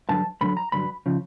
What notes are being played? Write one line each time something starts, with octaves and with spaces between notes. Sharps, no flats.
G2 D3 F#3 A5
G2 D3 F#3 B5
A#5
G2 D3 F#3 B5
C#3 F3